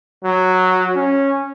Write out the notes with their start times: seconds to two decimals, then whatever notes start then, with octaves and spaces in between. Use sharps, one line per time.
0.24 F#3
0.96 C#4